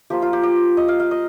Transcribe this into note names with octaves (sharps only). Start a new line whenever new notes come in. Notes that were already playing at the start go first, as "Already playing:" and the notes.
F3 A#3 F4 G4
F4
G4
G4
D#5
F5
F5
D#5